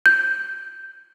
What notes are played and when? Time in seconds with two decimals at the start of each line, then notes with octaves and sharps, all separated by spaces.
0.06 G6